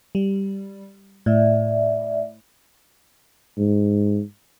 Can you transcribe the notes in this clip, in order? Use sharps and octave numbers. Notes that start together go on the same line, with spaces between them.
G3
A2 D5 E5
G#2